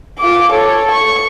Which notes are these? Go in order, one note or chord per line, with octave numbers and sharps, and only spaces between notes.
F4 D6
A4 C#5
C#6